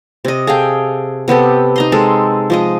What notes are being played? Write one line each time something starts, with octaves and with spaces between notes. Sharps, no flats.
C3 D#5
G#4 A4 F5 G5
C3 B3 G4 A4
D#4 A#5 C6
G#3 C4 A4
F3 G#3 D#5